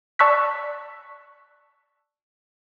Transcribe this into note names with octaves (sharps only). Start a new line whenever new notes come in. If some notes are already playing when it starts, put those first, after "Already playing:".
D5 A5 C#6 E6 F#6 B6